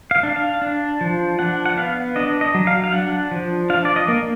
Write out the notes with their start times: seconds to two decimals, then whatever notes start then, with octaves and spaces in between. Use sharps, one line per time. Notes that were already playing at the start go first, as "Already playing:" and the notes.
0.11 F5
0.23 D4
0.36 F5
0.62 D4
1.01 F3
1.39 D4 F#5
1.66 F#5
1.77 B3 F5
2.16 D4 D#5
2.41 D#5
2.54 F#3
2.67 F5
2.84 F5
2.92 D4 F#5
3.31 F3
3.70 D4 F5
3.85 D5
3.96 D#5
4.08 A#3